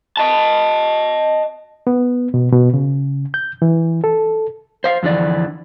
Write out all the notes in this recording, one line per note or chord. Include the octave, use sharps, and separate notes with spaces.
D#5 A5
B3
B2
B2
C#3
G6
E3
A4
C5 F5
F2 D3 E3 D5